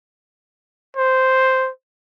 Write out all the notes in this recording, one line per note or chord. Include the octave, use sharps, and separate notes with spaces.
C5